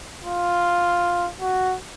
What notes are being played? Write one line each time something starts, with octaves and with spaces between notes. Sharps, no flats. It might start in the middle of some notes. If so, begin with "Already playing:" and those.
F4
F#4